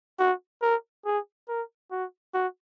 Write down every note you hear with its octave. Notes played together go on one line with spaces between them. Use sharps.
F#4
A#4
G#4
A#4
F#4
F#4